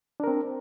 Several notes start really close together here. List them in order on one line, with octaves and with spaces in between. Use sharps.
D4 A#4 C4